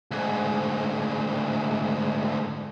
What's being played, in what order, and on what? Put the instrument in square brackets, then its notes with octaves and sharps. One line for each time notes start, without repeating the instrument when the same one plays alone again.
[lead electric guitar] D2 G#2